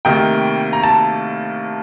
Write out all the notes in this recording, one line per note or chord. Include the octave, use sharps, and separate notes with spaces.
D2 C3 D#3 A#3 G5
A#5
A5